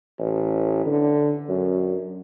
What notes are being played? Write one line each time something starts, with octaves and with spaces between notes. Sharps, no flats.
A1
D3
F#2